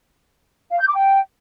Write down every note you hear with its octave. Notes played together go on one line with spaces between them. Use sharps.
F5
G6
D6
G5